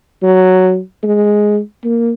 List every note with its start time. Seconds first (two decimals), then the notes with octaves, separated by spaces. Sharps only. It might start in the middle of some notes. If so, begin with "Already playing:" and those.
0.22 F#3
1.03 G#3
1.84 A#3